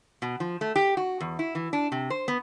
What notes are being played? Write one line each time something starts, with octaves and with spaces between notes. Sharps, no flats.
B2
F3
A3
G4
F#4
E2
E4
E3
D4
C3
C5
B3